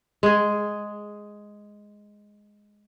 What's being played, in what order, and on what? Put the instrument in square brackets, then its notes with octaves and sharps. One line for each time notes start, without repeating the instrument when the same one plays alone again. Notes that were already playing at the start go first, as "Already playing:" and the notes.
[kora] G#3 G#4